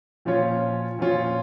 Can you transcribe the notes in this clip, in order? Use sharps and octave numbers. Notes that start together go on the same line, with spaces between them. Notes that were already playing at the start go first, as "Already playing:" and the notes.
A#2 F3 C#4 F4 C#5
A#2 F3 C#4 F4 C#5